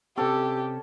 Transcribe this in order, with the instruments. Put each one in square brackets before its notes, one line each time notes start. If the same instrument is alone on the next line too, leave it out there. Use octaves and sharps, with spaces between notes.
[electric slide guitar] C3 C4 [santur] C#4 A4 D5 [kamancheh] G4